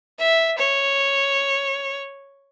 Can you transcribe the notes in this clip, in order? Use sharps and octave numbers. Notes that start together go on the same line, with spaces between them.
E5
C#5